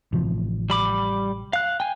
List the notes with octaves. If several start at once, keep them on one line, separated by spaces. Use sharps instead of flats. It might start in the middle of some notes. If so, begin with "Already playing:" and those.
A1 C3 F3
G3 B5 D6
F5 F#6
G5 G#5